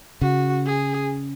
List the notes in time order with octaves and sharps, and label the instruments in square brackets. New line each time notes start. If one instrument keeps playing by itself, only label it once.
[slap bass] C#3 [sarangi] F#4
[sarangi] G#4